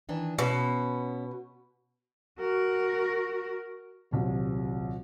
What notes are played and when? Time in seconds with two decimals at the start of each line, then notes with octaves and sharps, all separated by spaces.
0.09 D#3 E3 D4
0.38 B2 B3 C#4
2.40 F#4 A#4
4.11 D#1 C2 F#3